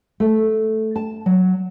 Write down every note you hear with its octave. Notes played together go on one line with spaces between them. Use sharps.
A3
A5
F#3